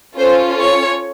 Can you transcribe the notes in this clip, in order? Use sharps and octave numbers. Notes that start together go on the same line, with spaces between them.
C#4 F4 A4 C5
C#5